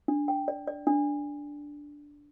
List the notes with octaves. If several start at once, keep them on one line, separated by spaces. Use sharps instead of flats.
D4
G5
D5
D5
D4